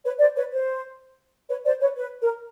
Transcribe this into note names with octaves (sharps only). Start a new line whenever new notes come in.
B4 C#5
C5 D5
B4 C#5
C5
B4 C#5
C5 D5
B4 C#5
B4
A#4